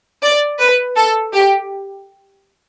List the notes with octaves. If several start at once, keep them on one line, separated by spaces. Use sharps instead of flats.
D5
B4
A4
G4